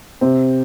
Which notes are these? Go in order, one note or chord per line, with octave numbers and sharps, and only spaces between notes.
C3 C4